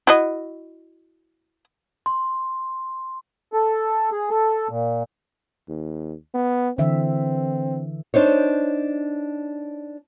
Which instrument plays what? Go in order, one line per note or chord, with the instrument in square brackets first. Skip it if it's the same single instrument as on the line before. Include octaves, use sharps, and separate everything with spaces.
[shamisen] E4 F#4 D#5
[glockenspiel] C6
[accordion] A4
G#4
A4
A#2
[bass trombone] D#2
B3
[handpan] D3 E3 E5 [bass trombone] C4
[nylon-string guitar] D4 D#4 C5 C#5